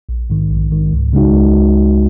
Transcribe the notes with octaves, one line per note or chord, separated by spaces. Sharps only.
A#1
G#2 D#3
A#1
G#2 D#3
C#2
C#3 G#3 D#4 F#4
C#2